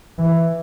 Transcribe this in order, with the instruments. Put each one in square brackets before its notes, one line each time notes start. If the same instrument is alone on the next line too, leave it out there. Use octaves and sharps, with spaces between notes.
[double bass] E3